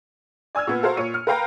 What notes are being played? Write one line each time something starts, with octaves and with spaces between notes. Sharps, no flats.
D5 G#5 E6 F6 G#6
A#2 B3
F#4 A4 A#4 C5 F5
A#2 C#5 C#7 D#7
F6
A#4 B4 F5 G5 A#5